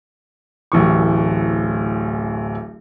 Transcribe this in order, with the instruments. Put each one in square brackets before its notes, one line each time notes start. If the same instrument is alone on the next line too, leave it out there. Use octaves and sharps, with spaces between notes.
[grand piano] D1 A1 E3 C#6